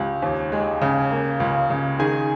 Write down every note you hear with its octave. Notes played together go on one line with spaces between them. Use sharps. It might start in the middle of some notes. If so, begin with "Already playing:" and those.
Already playing: C#2 G4
D#2
G#3
C#3
A#3
C#2
C#3
D#3 G#4 G#5